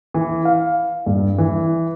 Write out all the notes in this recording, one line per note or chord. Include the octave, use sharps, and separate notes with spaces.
E3
F5
G2
E3